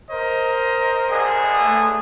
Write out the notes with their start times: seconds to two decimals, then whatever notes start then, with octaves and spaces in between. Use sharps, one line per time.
0.10 A#4 C5 D#5
1.10 B1 D3 G#4
1.61 A3